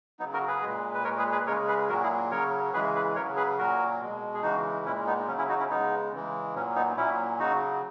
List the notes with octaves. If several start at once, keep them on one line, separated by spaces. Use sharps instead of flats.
C#3 F#3 B3 D#4
F#4 A#4
G#4 B4
A#2 G#3
B4
A#2 G#3 A#4 C#5
G#4 B4
G#4 B4
C#3 G#3 A#4 C#5
G#4 B4
A#2 F#3 F#4 A#4
E4 G#4
C#3 F#3 A#4 C#5
C#3 E3 G#3 G#4 B4
G#4 B4
C#3 F#3 A#4 C#5
G#4 B4
A#2 F#3 F#4 A#4
B2 G#3
G#4
C#3 E3 G#3 D#4 F#4
A#2 G#3 C#4 E4
B3 D#4
C#3 F#3 C#4
C#4 E4
D#4 F#4
C#4 E4
C#3 G#3 B3 D#4
C#3 E3 G#3
A#2 F#3 C#4
B3 D#4
A#2 F#3 C#4 E4
C#3 F#3 D#4 F#4